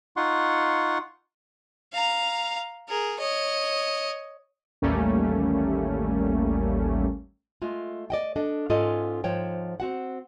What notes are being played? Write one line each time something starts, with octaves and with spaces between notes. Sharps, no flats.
D#4 F4 F#5 C6 C#6
F5 A#5
G#4 A#4
C#5 D#5
A1 D#2 G3 A3 A#3 C#4
G#3 A3 F4
D5 D#5 G5
D4 A4 D#5
G#2 C#4 F4 A4 D5 D#5
G#2 F3 C5 C#5 G5
C4 F#4 F#5